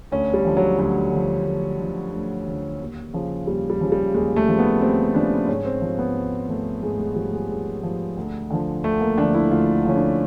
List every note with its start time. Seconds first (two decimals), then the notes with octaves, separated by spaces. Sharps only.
0.12 D2 C#4
0.34 G3
0.45 D3 F3
0.57 F#3
0.78 D2 F#3
1.12 D3 F3
1.46 D2
1.79 D3 F3
2.13 D2
2.47 D3 F3
2.80 D#2
3.14 C#3 F3
3.47 D#2 G3
3.70 G3
3.81 C#3 F3
3.92 G3
4.14 D#2 G#3
4.36 A3
4.48 C#3 F3
4.59 B3
4.81 D#2 C4
5.15 C#3 F3 D4
5.48 G#2 C#4
5.65 C4
5.82 F3
5.99 B3
6.16 G#2
6.49 F3 A3
6.82 G#2 G#3
7.00 G#3
7.16 F3 G3
7.33 G#3
7.50 G#2
7.83 F3
8.17 D2
8.50 D3 F3
8.84 D2 A3
9.01 A#3
9.18 D3 F3 D4
9.34 E4
9.51 D2 F4
9.85 D3 F3 C#4
9.96 D4